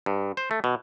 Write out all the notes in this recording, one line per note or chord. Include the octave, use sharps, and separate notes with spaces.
G2
C5
A3
B2